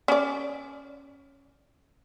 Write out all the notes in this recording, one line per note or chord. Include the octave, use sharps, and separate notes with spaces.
C#4 D5